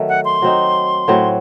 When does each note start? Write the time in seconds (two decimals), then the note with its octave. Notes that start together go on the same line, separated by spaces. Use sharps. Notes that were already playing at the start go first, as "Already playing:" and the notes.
Already playing: D#3 F#3 A3
0.09 F#5
0.25 C6
0.42 F#3 C4 D#4
1.08 A2 F#3 C4